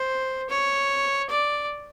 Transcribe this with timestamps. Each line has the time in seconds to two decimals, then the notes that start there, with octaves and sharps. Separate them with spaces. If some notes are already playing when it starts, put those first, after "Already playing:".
Already playing: C5
0.49 C#5
1.30 D5